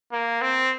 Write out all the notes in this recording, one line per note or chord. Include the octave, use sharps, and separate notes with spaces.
A#3
C4